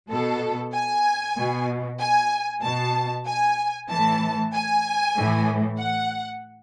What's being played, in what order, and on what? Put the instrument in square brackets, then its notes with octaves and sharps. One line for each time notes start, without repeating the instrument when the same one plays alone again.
[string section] B2 A4
G#5
B2
G#5
B2 A5
G#5
A2 E3 A5
G#5
A2 E3
F#5